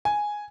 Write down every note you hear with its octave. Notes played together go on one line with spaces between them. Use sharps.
G#5